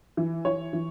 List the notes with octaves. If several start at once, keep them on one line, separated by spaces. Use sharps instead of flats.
E3
E3 C#5
E3